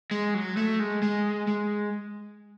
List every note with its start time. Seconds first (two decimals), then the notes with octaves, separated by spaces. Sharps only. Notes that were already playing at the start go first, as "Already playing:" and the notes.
0.11 G#3
0.34 F#3
0.57 A3
0.80 G#3
1.02 G#3
1.47 G#3